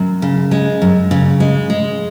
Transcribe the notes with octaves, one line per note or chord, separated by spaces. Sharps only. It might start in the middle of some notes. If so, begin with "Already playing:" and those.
Already playing: F#2
C#3
G#3
F#2
C#3
G#3
G#3